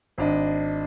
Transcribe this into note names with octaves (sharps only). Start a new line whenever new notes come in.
G#1 D4 D#5